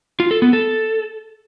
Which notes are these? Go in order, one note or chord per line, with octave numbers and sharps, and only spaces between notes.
F4
A4
B3
A4